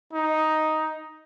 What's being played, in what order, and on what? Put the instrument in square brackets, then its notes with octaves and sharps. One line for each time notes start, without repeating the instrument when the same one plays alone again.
[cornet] D#4